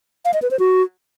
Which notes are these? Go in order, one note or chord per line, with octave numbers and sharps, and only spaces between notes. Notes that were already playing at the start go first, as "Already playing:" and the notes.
F5
D#5
B4
C5
F#4